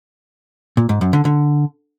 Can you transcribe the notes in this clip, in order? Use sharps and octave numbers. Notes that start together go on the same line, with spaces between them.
A#2
G#2
F#2
D3
D3